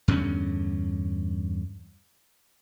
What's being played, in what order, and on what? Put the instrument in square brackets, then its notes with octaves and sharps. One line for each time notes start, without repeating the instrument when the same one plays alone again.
[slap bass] E2 G2 D3 C#4